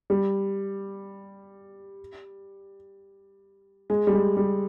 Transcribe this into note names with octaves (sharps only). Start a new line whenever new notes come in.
G3
G#3
G3
G#3
G3